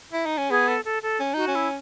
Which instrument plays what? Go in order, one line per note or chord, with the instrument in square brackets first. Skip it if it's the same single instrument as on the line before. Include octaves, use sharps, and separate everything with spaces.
[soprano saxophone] E4
D#4
C#4
[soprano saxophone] B3 [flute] G#4
[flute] A4
A4
A4
[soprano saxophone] C#4
[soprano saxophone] D#4 [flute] F#4
[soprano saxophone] C#4
[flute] E4